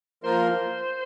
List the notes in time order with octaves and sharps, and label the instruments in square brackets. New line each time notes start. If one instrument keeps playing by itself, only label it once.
[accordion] F3 A#3 F4 A#4 [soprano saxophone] C5